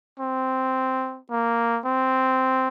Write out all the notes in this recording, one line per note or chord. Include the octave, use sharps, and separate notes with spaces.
C4
A#3
C4